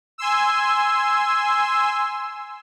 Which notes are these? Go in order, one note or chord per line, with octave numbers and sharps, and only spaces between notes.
G#5 C6 E6